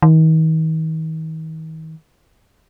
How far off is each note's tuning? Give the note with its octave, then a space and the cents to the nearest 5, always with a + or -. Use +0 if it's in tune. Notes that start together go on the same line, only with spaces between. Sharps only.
D#3 +40